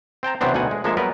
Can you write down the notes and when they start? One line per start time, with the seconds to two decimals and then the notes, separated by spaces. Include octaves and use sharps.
0.23 C4 G5 A5 A#5
0.41 C3 E3 F#3 B3 C4 D4
0.54 D2 B2 D#4 F#5 G#5
0.71 G#3
0.84 F3 G#3 A#3 D4 A4 E5
0.97 F#3 G3 B3 A#4 B4